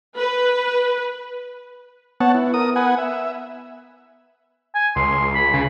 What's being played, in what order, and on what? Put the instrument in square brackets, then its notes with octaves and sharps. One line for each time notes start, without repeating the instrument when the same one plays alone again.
[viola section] B4
[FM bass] B3 [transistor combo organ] C#5 F#5 A5
[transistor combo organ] E4
A#4 D#6
B4 F#5 G#5
E5
[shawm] G#5
[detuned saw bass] C#2 [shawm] C6
[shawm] B5
[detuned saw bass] C#3